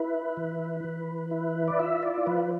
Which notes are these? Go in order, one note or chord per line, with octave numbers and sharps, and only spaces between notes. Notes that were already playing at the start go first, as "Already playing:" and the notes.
Already playing: E4 B4
E3
E3
E4
D5
F4 E5
D5
F3 B4